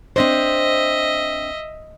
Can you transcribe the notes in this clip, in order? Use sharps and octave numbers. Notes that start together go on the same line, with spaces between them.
C4 D4 C5 D#5 E5